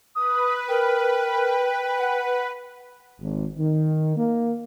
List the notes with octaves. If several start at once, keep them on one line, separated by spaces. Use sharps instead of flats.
B4 D#6
A#4 G5
F#5
G#1
D#3
A#3